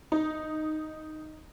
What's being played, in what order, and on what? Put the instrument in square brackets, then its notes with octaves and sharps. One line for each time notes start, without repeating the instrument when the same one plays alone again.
[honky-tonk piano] D#4